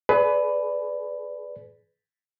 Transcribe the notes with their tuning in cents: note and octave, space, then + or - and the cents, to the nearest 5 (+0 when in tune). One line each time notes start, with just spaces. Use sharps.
G#4 +40 B4 +10 D5 +0